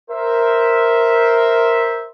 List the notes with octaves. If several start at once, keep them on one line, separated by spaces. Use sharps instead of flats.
A#4 C5 E5